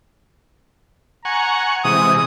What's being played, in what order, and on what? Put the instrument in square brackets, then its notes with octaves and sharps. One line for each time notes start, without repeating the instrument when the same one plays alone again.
[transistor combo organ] F#5 G#5 C#6 [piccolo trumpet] A#5
[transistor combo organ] C3 E3 G#3 [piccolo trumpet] D#6